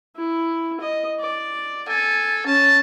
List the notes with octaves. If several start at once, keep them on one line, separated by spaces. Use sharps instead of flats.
E4
D#5
D5
A4 G#5
C#4 A5